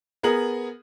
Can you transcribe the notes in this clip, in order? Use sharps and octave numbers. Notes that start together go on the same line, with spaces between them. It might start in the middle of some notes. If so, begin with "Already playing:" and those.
B3 G#4 A#4 F#7